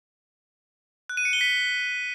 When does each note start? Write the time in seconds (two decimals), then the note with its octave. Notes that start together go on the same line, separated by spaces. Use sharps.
1.10 F#6
1.17 D#7
1.25 C#7
1.33 G7
1.41 B6